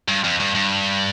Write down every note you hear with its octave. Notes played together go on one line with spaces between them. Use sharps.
G2
F2
G2
G2